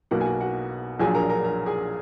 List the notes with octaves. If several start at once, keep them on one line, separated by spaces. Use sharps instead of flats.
B1 B2 A#3 F#4 F#5
G#5
F#4 F#5
F#4 F#5
A#1 A#2 F#3 D4 G#4 G#5
A#4 A#5
A#4 A#5
A#4 A#5
G#4 G#5